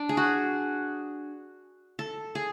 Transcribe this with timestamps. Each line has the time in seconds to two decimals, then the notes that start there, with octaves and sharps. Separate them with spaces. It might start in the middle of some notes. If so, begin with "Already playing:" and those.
Already playing: D4
0.09 G#4
0.17 F#4
1.99 A4
2.35 G#4